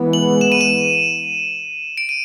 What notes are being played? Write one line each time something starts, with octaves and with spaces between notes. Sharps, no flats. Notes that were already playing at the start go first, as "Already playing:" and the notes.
Already playing: E3 G#3 B3
F#7
E7
D#7
E7
D7
D#7